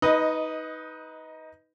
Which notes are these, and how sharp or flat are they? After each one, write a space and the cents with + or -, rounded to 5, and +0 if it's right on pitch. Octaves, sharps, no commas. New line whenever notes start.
D#4 +20 B4 +0 D#5 +0